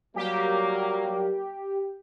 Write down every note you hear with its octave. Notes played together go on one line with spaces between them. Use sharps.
F#3 G3 A#3 G4